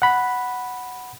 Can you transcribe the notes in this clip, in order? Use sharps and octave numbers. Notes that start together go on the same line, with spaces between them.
F#5 B5